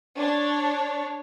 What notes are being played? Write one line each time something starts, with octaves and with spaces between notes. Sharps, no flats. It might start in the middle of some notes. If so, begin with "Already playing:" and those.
D4 C#5